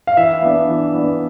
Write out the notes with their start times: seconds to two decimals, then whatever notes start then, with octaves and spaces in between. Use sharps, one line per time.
0.07 F5
0.17 E3 E5
0.42 B3 D4
0.68 E3
0.95 B3 D4